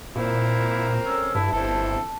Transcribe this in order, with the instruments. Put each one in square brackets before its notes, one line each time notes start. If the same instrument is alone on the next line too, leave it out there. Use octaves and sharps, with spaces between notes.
[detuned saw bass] A#2 [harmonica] C4 A#4 [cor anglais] E4
[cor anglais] C#4 [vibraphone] A4 E6
[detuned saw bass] G2 [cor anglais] E4 [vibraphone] A5
[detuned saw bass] G1 [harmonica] E3 C4 E4 [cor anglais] A4